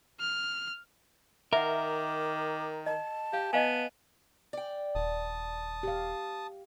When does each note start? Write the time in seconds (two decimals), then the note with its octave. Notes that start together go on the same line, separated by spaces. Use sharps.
0.20 F6
1.53 D#3 A#4 E5 F#5 D6
2.86 D#5 A5
3.33 G4 F5
3.53 B3 D#5 F5 G#5
4.53 D5 G5
4.95 D#1 A5 D#6
5.83 G4 F5